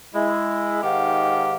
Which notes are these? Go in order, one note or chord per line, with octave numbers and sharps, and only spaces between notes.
G#3 E4
G#2 D#3 G4 F5 F#5